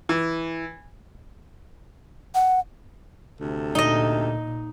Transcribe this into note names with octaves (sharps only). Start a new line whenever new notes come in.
E3
F#5
D2 C3 A4
A#2 D#4 D#5